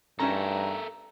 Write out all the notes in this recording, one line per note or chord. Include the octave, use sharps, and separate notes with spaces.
G2 C#4 D#4 F#4 A4 A#4 E5 A#5